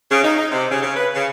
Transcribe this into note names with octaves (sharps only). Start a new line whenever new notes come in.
C#3
D#4
D#4
C3
C#3
C#3
B4
C#3